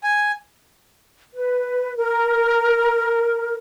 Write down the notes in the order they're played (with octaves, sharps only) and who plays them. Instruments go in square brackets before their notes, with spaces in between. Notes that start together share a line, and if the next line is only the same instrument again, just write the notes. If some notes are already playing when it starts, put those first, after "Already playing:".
[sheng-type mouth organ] G#5
[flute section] B4
A#4